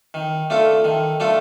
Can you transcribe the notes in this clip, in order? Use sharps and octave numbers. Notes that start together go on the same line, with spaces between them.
D#3
A3 D4 F4 A4
D#3
A3 D4 F4 A4